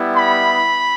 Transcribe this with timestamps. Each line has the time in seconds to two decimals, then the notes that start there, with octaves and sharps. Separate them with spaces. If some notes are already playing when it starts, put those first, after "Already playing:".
Already playing: G3 B3 E4
0.14 B5